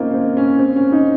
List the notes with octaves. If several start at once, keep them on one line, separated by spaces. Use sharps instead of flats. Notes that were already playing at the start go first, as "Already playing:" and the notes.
Already playing: A#3 C4 C#4 D#4 F4
C4
C#4
C4
C#4
D#4